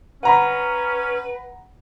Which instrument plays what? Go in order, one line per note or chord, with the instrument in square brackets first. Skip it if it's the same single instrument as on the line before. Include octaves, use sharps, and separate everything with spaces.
[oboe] C#4 [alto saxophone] B4 [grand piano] F#5 A#5 B5